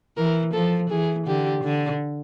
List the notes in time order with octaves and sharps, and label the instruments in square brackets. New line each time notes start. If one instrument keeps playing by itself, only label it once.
[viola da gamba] E3 [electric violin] A#4
[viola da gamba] F3 [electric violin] A4
[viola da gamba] E3 [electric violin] G#4
[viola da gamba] D3 [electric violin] G4
[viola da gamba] D3